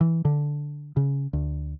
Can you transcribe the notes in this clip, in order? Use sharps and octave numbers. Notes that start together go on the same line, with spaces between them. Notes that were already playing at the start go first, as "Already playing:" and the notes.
E3
D3
C#3
D2